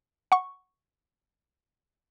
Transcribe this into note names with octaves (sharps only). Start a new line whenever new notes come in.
F#5 C#6